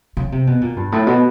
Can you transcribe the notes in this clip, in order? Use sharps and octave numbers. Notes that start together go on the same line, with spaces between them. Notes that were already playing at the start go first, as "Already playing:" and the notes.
C#3
C3
B2
A#2
G2
A2
B2